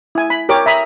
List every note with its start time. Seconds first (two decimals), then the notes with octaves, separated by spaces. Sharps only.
0.15 E4 G#5
0.30 B5
0.49 G4 A#4 C#5 D6
0.66 E5 A#5 B5 D#6